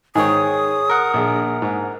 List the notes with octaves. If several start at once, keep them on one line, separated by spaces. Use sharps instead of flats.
G#2 D#3 G#4 C#5 G5 D#6
A#4 F#5
A#1 D4 G#4
G#2